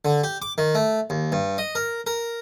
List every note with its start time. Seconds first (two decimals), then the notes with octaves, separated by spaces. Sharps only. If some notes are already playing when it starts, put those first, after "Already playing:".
0.05 D3
0.24 G4
0.42 D6
0.58 D#3
0.75 A3
1.10 D#2
1.32 G2
1.58 D#5
1.75 A#4
2.07 A#4